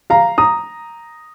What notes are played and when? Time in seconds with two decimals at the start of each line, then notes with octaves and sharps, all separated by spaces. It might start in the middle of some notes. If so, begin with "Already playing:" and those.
0.10 F5 A#5
0.38 A#5 D#6